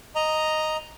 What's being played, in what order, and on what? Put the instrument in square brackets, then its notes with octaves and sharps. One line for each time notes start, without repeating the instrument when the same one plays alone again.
[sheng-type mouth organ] D#5 A#5